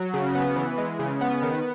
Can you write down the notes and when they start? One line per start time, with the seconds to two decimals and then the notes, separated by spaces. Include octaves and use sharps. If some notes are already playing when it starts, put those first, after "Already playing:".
Already playing: F#3
0.14 C#3
0.35 B3
0.56 E3
0.78 G#3
0.99 C#3
1.21 B3
1.42 D#3